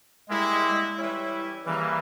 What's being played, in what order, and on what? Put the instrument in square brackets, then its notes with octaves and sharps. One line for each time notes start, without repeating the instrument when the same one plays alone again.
[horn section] G3 A#3 E4 [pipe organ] G#3
[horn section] E3 G3 C#4 E4
[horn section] C#3 G3 A#3 [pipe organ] E3